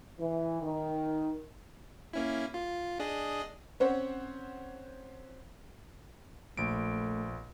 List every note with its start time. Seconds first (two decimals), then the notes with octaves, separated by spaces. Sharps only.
0.19 E3
0.62 D#3
2.13 A#3 C#4 E4
2.54 F4
3.00 D4 G#4 D#5
3.80 C4 C#4 C5 C#5 F#5
6.57 A#1 A3 D7